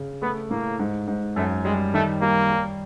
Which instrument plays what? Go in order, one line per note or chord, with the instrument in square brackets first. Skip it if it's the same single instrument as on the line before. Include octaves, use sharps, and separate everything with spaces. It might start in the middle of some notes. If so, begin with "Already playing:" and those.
Already playing: [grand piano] C#3
[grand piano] A3 [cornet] B3
[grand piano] A2 [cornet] A#3
[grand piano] G#2
G#2
[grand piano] F#2 [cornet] A3
[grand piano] G3 [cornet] G#3
[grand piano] D#3 [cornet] A3
[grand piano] G3 [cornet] A#3
[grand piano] G3